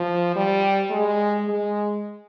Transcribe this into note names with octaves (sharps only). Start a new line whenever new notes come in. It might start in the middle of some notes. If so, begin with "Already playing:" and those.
Already playing: F3
G3
G#3
G#3